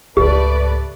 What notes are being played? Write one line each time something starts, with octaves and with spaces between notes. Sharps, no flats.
C#2 G#2 A3 G4 B4 D5